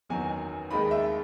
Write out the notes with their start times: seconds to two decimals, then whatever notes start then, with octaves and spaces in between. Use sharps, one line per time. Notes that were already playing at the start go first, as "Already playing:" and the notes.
0.09 F#1 E2 D#3 F#3 G#5
0.71 D#2 D#3 G#3 D#4 B5
0.91 E5